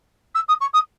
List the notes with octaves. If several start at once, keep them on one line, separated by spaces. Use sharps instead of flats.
E6
D#6
C#6
D#6